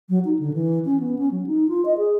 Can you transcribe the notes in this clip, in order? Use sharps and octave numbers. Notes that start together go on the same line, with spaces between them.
F#3
D#4
D3
E3
C#4
B3
C#4
F#3
D#4
F4
D#5
G#4